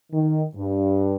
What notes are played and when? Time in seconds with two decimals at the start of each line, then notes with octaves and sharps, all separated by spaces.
0.12 D#3
0.56 G2